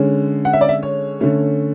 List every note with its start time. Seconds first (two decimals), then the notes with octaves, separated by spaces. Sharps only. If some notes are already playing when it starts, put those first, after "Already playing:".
Already playing: D3 G#3 C#4
0.45 F#5
0.53 E5
0.61 D5
0.69 E5
0.83 C#5
1.20 D3 A3 C#4